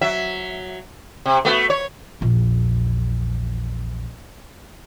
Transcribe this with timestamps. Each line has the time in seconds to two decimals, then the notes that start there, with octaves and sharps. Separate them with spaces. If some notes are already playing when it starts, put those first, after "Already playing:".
0.01 F#3 E5
1.26 C3
1.45 A3 B3 F#4
1.70 C#5
2.21 A#1 E2